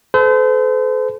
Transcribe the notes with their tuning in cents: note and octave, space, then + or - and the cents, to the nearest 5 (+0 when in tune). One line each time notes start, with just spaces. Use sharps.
A4 -30 C5 -40